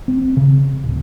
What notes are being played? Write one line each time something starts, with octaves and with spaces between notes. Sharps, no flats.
C4
C#3
D1